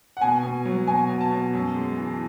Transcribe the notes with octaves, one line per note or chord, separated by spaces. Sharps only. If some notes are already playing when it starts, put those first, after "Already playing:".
F#5
B2 G#5
B2
F#3
B2 G#5
B2
A5
B2
F#2
G#3
E3